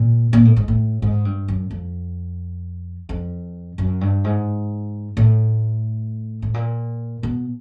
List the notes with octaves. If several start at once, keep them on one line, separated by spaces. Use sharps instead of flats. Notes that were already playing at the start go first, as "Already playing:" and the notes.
Already playing: A#2
A#2
A2
G#2
A2
G#2
G2
F#2
F2
F2
F#2
G2
G#2
A2
A2
A#2
B2